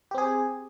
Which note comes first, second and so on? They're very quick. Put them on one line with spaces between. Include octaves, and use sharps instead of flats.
G4 C4 G#4